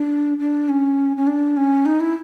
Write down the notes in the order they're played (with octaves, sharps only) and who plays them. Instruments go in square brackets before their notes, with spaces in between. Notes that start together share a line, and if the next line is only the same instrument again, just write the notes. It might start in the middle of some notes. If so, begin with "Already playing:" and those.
Already playing: [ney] D4
D4
C#4
C#4
D4
C#4
D#4
E4